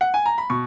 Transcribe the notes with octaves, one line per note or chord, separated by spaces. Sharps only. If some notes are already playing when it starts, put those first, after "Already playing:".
F#5
G#5
A#5
B5
B2 C#6